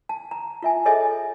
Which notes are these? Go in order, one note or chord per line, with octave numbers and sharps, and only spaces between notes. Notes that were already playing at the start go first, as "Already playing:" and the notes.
A5
A#5
F4 E5 G#5
G#4 A4 C#5 D#5 E5 G#5